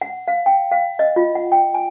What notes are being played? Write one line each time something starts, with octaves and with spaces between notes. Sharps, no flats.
F#5
F5
G5
F5
D#5
F4
F#5
G5
G#5